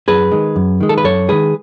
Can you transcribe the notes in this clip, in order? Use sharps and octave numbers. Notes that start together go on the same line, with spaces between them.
F#2 G#4 B4
D#3 G#3
F#2
D#3 G#3
A4
B4
F#2 A4 C#5
D#3 G#3 G#4 B4